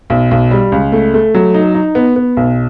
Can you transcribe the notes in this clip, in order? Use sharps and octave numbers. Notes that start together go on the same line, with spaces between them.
B1
B1
G3
C#2
A3
A3
F#3
D#4
D#4
B3
B3
B1